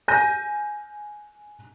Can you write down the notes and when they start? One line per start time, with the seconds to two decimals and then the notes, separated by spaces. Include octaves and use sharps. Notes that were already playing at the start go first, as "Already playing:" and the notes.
0.08 G#5 G6 A#6 D#7